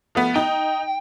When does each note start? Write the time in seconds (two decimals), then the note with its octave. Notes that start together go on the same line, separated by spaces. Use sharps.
0.15 F3 A3 B3
0.36 D#4 G5